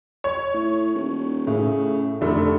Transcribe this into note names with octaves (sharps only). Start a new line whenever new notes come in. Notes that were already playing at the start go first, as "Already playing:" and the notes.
C#5
A2
D#1
A2 C#3
F1 D3 A3